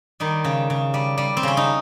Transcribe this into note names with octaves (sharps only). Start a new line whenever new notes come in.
D#3 G3 D#4
C#3
C#3
G3
G3
C4
C#3 C#4
D#4